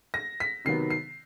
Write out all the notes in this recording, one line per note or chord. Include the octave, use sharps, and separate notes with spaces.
A#6
B6
C3 D#3 F#3 B3 C7
C7